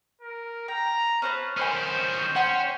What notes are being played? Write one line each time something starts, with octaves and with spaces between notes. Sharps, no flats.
A#4
G5 A#5
C#4 B4 C5 A5
D#3 C#4 C5 G#5 C6 F6
C#4 F#5 G5 C6